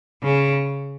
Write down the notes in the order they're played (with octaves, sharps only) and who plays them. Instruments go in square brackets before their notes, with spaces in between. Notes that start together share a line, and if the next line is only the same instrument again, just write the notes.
[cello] C#3